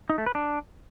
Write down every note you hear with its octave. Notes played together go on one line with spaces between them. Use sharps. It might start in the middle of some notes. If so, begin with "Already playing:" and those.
D#4
A3
B4
D4